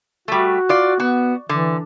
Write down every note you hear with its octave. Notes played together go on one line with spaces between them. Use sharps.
G3 A3 F#4
F4 D5
B3 F#4
D3 E3